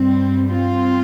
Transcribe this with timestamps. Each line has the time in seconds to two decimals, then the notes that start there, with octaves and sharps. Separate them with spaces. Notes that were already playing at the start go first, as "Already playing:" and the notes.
Already playing: G2 G3 C4
0.50 C4 F4